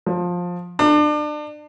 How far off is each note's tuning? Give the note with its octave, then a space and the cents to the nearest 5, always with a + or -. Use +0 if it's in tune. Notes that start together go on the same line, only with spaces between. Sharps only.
F3 +15
D4 +30